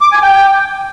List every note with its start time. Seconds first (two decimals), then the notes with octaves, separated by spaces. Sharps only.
0.01 D6
0.12 G#5
0.23 G5